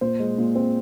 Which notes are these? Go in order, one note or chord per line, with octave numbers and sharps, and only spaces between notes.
A#2 C5
G#3
A#2
C4